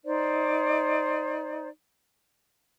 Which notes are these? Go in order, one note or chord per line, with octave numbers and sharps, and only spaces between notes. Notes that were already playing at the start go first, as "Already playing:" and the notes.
D#4 C5 D5